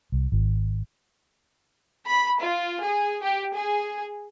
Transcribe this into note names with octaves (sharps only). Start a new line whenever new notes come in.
C2
G#1
B5
F4
G#4
G4
G#4